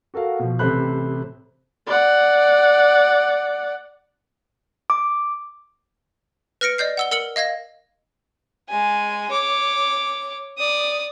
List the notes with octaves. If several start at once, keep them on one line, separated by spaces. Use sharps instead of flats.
F#4 A4 A#4 F5 F#5
B2 F3
A1 C3 A4 C5 B5 F#6
D5 F#5
D6
B4 F6 A#6 C#7 D7
D5 D#5 G6 C7
F#5 E6 G7
A#4 E6 C#7 F#7 G7
D#5 F5 G#6 A#6
G#3 G#5
C#5 D6
D5 D#6